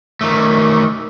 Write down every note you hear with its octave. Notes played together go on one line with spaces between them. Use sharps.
D#3 A3